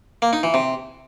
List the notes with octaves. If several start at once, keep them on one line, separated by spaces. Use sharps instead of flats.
A#3
D#4
E3
C3